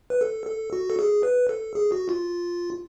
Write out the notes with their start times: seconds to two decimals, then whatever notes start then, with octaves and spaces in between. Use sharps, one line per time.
0.10 B4
0.21 A4
0.47 A4
0.73 F#4
0.90 A4
0.99 G#4
1.23 B4
1.49 A4
1.75 G#4
1.92 F#4
2.09 F4